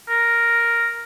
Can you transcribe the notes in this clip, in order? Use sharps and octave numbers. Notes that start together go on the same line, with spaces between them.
A#4